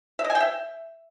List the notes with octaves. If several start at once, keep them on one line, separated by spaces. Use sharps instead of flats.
E5
D#5
G#5
G5
E5